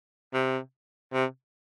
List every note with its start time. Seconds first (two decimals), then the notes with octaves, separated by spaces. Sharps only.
0.34 C3
1.13 C3